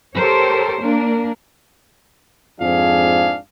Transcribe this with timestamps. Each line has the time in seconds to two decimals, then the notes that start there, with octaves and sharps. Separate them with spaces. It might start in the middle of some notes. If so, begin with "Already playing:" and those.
0.14 G4 A4 A#4 C5 C#5
0.81 A#3 D4 A#4
2.60 F2 G#2 F3 D4 G#4 F5